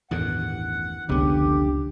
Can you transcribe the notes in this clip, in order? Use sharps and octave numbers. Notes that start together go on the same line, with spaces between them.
A1 E2 G2 D#3 F#5
F1 C#2 D3 B3 G4